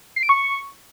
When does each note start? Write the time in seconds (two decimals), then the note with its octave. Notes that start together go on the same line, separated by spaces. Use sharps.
0.16 C7
0.23 D7
0.29 C#6